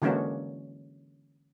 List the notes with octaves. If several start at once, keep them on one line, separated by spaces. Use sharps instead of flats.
D3 E3 G#3 A#3 C#4 F#4